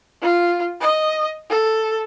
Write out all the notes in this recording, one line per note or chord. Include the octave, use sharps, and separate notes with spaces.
F4
D#5
A4